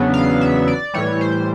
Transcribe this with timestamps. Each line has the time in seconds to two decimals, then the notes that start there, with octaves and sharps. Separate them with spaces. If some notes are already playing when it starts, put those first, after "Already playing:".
Already playing: E2 C#3 F#3 B3 D4
0.14 F5
0.41 E5
0.68 D5
0.94 A2 E3 G3 C#5
1.21 C5